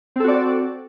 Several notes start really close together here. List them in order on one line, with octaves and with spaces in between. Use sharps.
C4 A4 F#4 D5